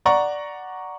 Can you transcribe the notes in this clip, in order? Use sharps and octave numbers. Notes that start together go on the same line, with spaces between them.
D5 F#5 A#5 C#6